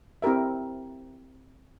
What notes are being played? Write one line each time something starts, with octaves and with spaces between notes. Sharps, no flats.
C4 E4 G4 A#4 E5